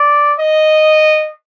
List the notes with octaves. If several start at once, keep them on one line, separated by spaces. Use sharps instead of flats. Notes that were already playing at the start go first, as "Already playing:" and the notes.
Already playing: D5
D#5